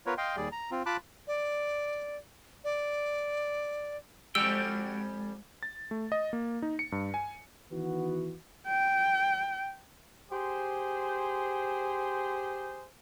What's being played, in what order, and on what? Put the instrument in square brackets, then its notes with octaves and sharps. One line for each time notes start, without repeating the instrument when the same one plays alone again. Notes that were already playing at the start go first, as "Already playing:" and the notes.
[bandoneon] B3 F4 A#4 B4 C#5
D#5 F5 G5 C6
D#2 G3 G#4 D5
A#5
C4 F4
F4 A5 B5 D6 F#6
[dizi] D5
D5
[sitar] F2 G3 [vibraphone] G#3 [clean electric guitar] F#4 D5 G5 [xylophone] E6
[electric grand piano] A6
A3
D#5
A#3
D#4
C#7
G2
G#5
[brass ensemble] D#3 E3 B3 F#4
[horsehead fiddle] G5
[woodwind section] G4 G#4 C5